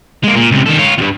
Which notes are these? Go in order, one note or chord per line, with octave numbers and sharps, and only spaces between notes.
G#3 A#3
A#2
C#2 C3
D#3 A4
F4 C#5
E2 G2